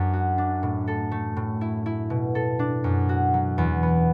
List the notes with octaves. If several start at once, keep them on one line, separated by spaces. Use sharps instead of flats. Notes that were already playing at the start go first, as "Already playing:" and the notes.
Already playing: F#2 D4
F#4
D4
A2
A4
A3
A2
E4
E4
B2
A4
D4
F#2
F#4
F#3
E2
B3